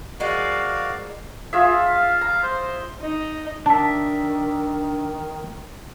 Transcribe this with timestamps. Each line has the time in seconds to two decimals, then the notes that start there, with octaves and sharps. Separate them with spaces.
0.20 F3 G#3 A#3 F#4 D5 F5
1.53 F4 G#4 E5
1.89 F5
2.21 A#5
2.43 C5
3.01 D#4
3.66 D#3 D4 E5 A5